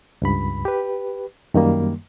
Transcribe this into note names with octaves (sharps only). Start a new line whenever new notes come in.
C#2 G2 B5
G4 B4
F#2 D#3 G3 A#3